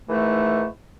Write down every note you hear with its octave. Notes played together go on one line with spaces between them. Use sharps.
G#2 D#3 E3 A3